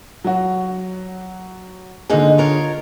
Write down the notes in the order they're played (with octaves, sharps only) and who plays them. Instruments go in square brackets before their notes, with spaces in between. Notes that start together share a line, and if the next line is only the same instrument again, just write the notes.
[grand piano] F#3 F#4
[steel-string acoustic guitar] G#2 A#3 D#4 [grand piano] D3 G#4
[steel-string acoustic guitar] F4 A#4 C#5